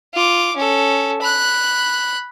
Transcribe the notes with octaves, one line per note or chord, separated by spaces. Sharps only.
F4 D6
C#4 A4
B5 F#6